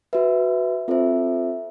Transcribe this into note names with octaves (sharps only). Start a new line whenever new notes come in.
F#4 B4 E5
C4 F4 A4 C5 E5